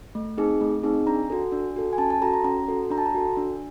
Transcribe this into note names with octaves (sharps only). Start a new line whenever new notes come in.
A3
C4 D#4 G#4
A3
C4 D#4 G#4
D4 A#5
F#4 A4
D4
F#4 A4
G#5
C#4 A5
A5
F#4 A4 A#5
A#5
C#4 A#5
F#4 A4
D4 A#5
A5
A#5
F#4 A4
D4